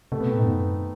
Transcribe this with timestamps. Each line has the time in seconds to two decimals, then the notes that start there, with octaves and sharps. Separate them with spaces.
0.12 C3 A3
0.20 B2 B3
0.28 C4
0.34 A2 D#4
0.45 F#2 B3